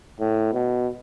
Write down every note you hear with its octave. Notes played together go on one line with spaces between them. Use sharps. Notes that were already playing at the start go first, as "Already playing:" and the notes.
A2
B2